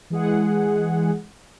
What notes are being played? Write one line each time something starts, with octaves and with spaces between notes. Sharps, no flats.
E3 G#3 G#4 F#5